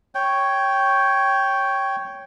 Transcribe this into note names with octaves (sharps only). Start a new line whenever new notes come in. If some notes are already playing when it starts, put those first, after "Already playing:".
C#5 G5